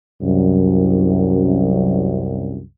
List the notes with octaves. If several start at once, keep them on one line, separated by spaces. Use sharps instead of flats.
C2 F#2